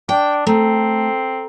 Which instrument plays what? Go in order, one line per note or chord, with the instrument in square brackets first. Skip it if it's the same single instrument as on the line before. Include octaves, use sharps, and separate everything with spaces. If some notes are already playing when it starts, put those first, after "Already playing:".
[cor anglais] D4 [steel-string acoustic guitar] G5
[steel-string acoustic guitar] A3 [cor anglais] C4 [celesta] A4 A#5